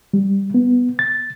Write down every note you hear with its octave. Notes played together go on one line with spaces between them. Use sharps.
G3
B3
A6